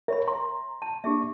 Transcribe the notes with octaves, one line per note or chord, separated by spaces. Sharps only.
A#4 C#5 E5 B5
A#5 C6
A5
A#3 D4 G4 G#4 E5